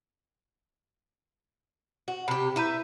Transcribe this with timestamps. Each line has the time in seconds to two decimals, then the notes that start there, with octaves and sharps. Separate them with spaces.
2.08 F#4
2.28 C3 G4 B5
2.56 E4 B4 E5 A#5 G6